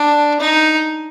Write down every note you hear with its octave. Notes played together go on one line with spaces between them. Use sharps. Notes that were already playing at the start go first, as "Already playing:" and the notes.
Already playing: D4
D#4